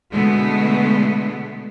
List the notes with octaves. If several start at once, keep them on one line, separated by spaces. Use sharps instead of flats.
B2 D3 G#3 A3 B3